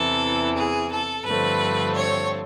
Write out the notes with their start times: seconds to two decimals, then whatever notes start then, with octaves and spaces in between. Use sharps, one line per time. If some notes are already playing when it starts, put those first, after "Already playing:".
Already playing: E2 C3 E3 A4
0.56 G#4
0.91 A4
1.25 G2 D3 F3 A3 C4 B4
1.95 C#5